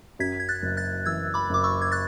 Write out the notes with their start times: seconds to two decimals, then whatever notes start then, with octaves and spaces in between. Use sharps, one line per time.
0.19 F#2 G#6 B6
0.40 G#6
0.49 F#6 A6
0.62 F#1
0.77 F#6 A6
1.05 E3 E6 G#6
1.34 B5 D6
1.49 F#1 D6
1.64 C#6 E6
1.82 G#6
1.92 F#6 A6